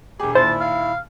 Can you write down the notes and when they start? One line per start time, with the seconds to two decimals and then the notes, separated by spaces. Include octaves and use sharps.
0.20 E1 G4 G#4
0.35 D#2 A#2 E4 C5 A5
0.61 F5